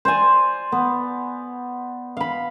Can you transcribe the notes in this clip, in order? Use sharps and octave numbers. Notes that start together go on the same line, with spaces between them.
C5 D5 G#5
B3
F5 B5